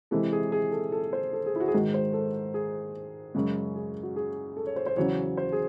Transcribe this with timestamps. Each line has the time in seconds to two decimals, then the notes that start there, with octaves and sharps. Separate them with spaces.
0.11 C3 E3 G#3 A4
0.32 G#4
0.52 G#4
0.72 A4
0.92 A4
1.13 C5
1.33 A4
1.46 G#4
1.56 E4
1.60 F#4
1.68 G#4
1.74 G#2 D#3 G#3 F#4
1.94 C5
2.13 A4
2.54 G#4
3.35 F#2 C#3 G#3
3.76 G#4
4.03 F#4
4.16 G#4
4.57 A4
4.67 C#5
4.76 C5
4.86 C5
4.97 E2 C#3 F#3 C#5
5.37 C5
5.52 G#4